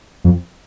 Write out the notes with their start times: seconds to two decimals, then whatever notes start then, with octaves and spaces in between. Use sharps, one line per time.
0.24 F2